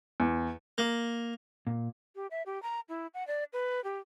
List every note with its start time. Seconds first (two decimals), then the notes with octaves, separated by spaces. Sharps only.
0.20 E2
0.78 A#3
1.67 A#2
2.16 G4
2.31 E5
2.46 G4
2.62 A#5
2.89 E4
3.14 F#5
3.27 D5
3.53 B4
3.84 G4